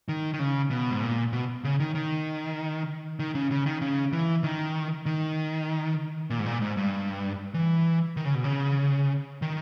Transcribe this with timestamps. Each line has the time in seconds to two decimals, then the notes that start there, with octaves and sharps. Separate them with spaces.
0.08 D#3
0.34 D#3
0.39 C#3
0.71 B2
0.91 G#2
1.02 A#2
1.33 B2
1.64 C#3
1.80 D#3
1.95 D#3
3.19 D#3
3.35 C#3
3.51 C#3
3.66 D#3
3.82 C#3
4.12 E3
4.44 D#3
5.06 D#3
6.30 A#2
6.39 G#2
6.46 A#2
6.62 G#2
6.77 G2
7.54 E3
8.17 D#3
8.26 C#3
8.35 B2
8.44 C#3
9.42 D#3